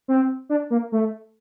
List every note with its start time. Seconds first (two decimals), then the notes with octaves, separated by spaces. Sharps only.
0.08 C4
0.49 D4
0.70 A#3
0.92 A3